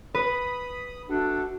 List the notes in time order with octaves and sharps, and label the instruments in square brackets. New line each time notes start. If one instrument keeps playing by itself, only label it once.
[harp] B4 [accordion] B5 D#6
[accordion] A3 A4 [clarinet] D4 [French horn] F#4